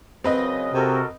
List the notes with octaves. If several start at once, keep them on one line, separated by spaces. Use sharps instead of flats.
F#2 C#3 C4 B4 D#5
C3 F#4 A4 A#4